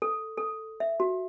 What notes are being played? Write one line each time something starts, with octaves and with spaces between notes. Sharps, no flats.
A4
A4
E5
F#4